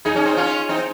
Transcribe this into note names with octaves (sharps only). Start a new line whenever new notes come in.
D#4 G#4
C#4
C4 D#4
C#4 F4
C4 D#4